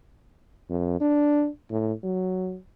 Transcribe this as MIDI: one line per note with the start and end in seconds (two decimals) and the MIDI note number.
0.70 0.96 41
1.01 1.48 62
1.71 1.93 45
2.04 2.58 54